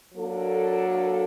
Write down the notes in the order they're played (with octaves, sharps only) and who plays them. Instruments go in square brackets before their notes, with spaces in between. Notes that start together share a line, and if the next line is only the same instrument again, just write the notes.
[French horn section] F#3 A#3 D4 F#4 A4